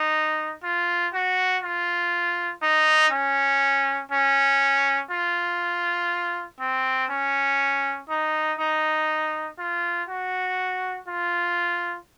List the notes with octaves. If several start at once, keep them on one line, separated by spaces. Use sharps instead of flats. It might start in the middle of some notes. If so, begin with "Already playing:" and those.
Already playing: D#4
F4
F#4
F4
D#4
C#4
C#4
F4
C4
C#4
D#4
D#4
F4
F#4
F4